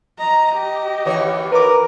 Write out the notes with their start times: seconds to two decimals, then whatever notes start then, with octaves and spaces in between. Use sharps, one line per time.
0.20 D#5 A#5
0.56 G4
1.05 D#2 E3 C#5
1.52 A#4 B4 D6